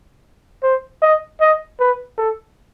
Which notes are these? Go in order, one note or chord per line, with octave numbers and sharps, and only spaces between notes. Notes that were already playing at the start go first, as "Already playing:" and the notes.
C5
D#5
D#5
B4
A4